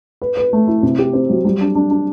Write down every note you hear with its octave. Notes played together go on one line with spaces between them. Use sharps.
B4
B4
A3
E4
C3
G4
C4
F#3
G3
D4
D4
D4